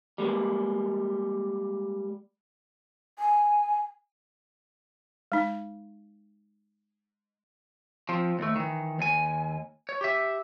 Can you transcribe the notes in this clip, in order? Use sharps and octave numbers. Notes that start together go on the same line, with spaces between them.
G3 G#3 A#3
G#5
G#3 D#4
F3 C4
D#2 A3
D#3 E3
D#2 G#5
C#5
G4 E5